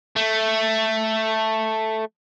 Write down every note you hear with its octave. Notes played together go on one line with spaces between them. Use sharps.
A3